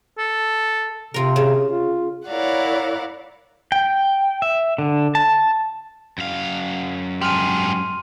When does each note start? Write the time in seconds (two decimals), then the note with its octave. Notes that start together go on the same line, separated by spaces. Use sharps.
0.19 A4
1.14 C3 F4 A#4
1.36 C#3
1.68 F4
2.27 E4 A#4 C#5 D5 F5 F#5
3.72 G5
4.42 E5
4.78 D3
5.15 A5
6.18 F#2 F5
7.21 G#2 G3 C6 F6 D#7